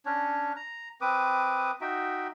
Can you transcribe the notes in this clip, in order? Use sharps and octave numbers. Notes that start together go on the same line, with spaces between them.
C#4 D4 C#5
A#5
C4 B4 D6 D#6
D#4 F#4 E5 G5